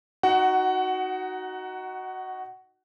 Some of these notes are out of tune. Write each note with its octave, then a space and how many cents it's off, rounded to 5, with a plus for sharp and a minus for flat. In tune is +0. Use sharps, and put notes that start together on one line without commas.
D#4 +5 F#4 +0 F#5 +20